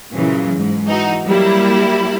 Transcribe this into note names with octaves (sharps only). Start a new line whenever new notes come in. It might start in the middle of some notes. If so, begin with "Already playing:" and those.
A#2 C#3 E3 F#3
G#2
E3 D#4 F#4
F#3 G3 A#3 E4